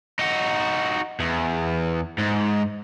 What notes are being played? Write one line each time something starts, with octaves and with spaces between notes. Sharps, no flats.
D#4 F#4
E2
G#2